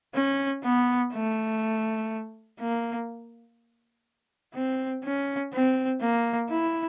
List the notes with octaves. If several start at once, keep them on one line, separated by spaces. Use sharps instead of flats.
C#4
B3
A3
A#3
C4
C#4
C4
A#3
E4